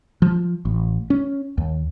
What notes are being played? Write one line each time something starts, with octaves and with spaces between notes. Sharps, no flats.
F3
A1
C#4
D#2